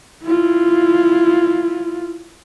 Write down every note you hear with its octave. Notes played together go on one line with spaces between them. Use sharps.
E4 F4